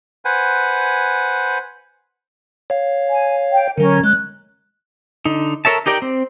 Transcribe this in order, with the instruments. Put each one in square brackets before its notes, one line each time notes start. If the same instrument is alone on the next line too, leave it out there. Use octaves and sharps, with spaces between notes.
[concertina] B4 C5 F#5 G#5
[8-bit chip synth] C#5 F5
[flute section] G#5
G5
[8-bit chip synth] D3 F#3 [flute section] C#4 A#4
[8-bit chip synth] G#3 [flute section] F#6
[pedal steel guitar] D3 D#4
A4 A#4 C#5 E5 A5
D#4 G4 A#4 D5 G5
C4